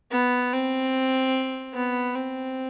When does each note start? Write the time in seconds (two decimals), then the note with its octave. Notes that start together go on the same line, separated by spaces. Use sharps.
0.11 B3
0.53 C4
1.74 B3
2.15 C4